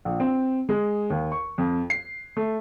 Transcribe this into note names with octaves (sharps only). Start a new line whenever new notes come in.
A#1
C4
G#3
D#2
C#6
F2
C7
A3